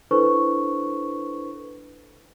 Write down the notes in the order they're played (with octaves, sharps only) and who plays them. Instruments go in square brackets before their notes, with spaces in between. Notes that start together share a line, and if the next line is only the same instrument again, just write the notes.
[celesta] D4 E4 A4 B4 C5 C#6